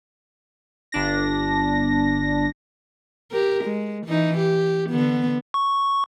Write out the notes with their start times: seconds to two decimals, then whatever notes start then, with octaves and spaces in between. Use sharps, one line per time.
0.92 G1 D4 A#6
3.31 G4 A#4
3.64 G#3
4.07 E3 D#4
4.38 G4
4.90 D3 B3
5.54 C#6